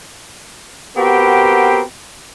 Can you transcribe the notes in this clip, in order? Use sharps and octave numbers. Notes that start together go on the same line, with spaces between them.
B3 C4 F#4 G4 A#4